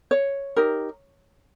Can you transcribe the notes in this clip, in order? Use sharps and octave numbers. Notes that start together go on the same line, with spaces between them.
C#5
D#4 G4 A#4